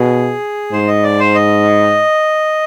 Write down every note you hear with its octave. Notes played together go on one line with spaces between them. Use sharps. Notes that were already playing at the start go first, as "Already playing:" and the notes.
Already playing: B2 G#4
G#2 C5
D#5
D5
C5
D#5